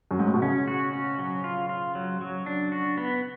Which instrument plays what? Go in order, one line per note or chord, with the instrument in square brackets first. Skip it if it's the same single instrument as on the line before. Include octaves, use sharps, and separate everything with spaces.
[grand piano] F#2
G#2
A2
B2
[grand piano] C#3 [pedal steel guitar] C#4
[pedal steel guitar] F#4
C#4
F#3
F4
F4
F#3
F#3
D4
F#4
B3